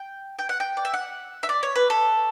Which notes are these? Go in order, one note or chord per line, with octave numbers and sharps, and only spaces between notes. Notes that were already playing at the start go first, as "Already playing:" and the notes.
Already playing: G5
G5
F#5
G5
D5
E5
F#5
E5
D5
C#5
B4
A4